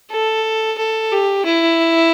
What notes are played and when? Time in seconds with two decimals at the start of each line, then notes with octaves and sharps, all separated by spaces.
0.11 A4
0.79 A4
1.12 G4
1.46 E4